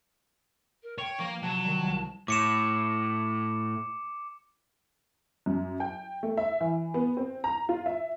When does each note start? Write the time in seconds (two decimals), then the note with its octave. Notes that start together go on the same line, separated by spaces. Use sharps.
0.82 A#4
0.98 C#5 G5
1.19 F3 A#3
1.43 C3 F#3 A5
1.64 D#3 G3
1.84 C2
2.28 A2 D6 C#7 E7
5.46 F#2
5.80 G5
6.23 A3
6.37 E5
6.61 E3
6.94 B3
7.17 C4
7.44 A#5
7.69 F4
7.86 E5